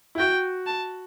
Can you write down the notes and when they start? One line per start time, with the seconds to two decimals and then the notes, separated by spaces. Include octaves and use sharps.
0.15 E4
0.18 F#4 G5
0.67 A5